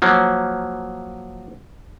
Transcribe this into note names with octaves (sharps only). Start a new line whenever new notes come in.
F3 F#3 A#3